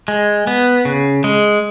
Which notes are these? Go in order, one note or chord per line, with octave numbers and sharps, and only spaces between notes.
G#3
B3
C#3
G#3